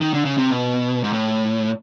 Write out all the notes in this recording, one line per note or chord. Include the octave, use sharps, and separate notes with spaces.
D#3
D3
C#3
C3
B2
G#2
A2